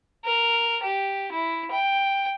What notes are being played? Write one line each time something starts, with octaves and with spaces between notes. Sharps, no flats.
A#4
G4
E4
G5